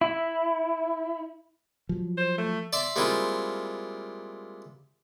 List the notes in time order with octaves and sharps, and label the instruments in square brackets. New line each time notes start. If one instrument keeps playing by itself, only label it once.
[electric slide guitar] E4
[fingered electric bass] F3 F#3
[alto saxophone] C5
A3
[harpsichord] D5 E5 C6
G3 G#3 A#3 C4 E4 F4